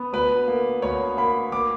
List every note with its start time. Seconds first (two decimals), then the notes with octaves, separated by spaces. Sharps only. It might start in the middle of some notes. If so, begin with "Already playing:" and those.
Already playing: B3
0.13 D2 B4
0.48 A#3
0.82 D2 C#5
1.18 A#3 B5
1.52 A#3 D6